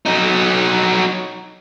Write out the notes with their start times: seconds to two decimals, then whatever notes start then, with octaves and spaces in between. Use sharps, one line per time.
0.06 F#3 D#4